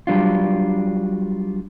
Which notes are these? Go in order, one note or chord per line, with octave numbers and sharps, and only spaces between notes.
F#3 G3 D4 F4